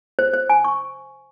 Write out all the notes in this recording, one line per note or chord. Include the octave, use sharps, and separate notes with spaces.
C5
C5
G#5
C#6